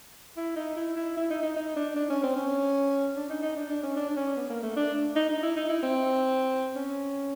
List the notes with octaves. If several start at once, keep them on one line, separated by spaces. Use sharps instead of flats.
E4
D#4
E4
E4
E4
D#4
D#4
D#4
D4
D4
C#4
C4
C#4
D4
D#4
D#4
D4
D4
C#4
D4
D4
C#4
B3
A#3
A3
D4
D#4
D#4
E4
D#4
E4
C4
C#4